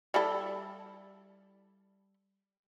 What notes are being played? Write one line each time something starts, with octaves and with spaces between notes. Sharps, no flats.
G3 E4 A4